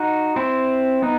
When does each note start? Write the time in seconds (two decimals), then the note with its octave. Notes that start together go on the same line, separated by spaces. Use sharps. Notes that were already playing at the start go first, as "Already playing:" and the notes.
Already playing: D#4 F#4
0.36 C4 E4
1.02 B3 D#4